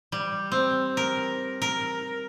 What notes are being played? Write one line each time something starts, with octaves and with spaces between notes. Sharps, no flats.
G3
C4
A#4
A#4